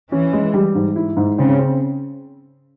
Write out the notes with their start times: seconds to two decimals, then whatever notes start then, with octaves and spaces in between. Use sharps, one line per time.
0.12 E3 C#4
0.33 G#3
0.54 G3
0.75 G#2
0.96 E4
1.17 G#2
1.38 C#3 C4
1.59 C4